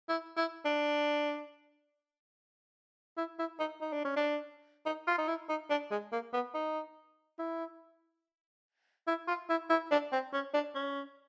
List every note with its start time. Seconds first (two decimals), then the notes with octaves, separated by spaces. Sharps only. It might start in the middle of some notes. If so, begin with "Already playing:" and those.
0.09 E4
0.37 E4
0.65 D4
3.17 E4
3.39 E4
3.60 D#4
3.81 D#4
3.93 D4
4.05 C#4
4.16 D4
4.86 D#4
5.07 F4
5.18 D#4
5.28 E4
5.49 D#4
5.70 D4
5.91 G#3
6.12 A#3
6.33 B3
6.54 D#4
7.39 E4
9.08 E4
9.28 F4
9.50 E4
9.70 E4
9.91 D4
10.12 C4
10.33 C#4
10.54 D4
10.75 C#4